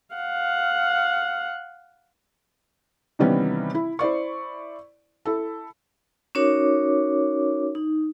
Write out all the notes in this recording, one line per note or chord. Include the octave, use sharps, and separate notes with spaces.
F5 F#5
C3 D#3 E3 G3 B3 C#4
E4
E4 C5 D5 C#6
E4 A4
C#4 D#4 F#4 A#4 C#5 D6
D#4